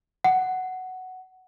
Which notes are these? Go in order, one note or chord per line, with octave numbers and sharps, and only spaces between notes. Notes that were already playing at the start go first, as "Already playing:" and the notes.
F#5